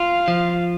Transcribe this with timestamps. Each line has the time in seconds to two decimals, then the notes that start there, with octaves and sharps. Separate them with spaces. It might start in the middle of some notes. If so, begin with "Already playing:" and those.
Already playing: F4 F5
0.28 F3